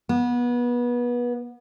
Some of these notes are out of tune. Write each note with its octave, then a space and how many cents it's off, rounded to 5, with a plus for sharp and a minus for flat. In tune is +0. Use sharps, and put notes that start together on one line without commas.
B3 -25